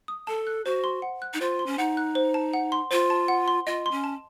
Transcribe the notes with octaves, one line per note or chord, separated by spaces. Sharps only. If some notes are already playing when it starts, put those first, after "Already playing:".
D#6
A4 A5
F#6
F#4 C5
C6
F#5
F#6
D#4
F4 C5
C6
C#4
D#4 F#5
F#6
C5
A5
F#5
C6
F4 C5
A5
F#5
C6
F4 D#5
C6
C#4
A5